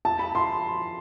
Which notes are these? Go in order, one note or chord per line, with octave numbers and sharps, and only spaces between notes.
A5
B5
C6